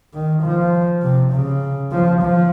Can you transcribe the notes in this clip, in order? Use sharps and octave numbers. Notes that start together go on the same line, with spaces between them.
D#3
F3
C3
C#3
F3
F3